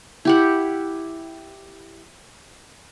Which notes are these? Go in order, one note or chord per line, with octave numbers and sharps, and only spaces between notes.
E4 G4 F#5